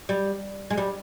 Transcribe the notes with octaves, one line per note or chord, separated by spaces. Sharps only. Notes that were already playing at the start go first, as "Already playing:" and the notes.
G3
G#3
G3